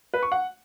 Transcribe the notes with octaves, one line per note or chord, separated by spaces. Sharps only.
B4
C#6
F#5